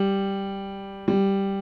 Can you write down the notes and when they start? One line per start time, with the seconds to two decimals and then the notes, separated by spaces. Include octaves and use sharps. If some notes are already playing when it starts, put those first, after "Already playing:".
Already playing: G3
1.08 G3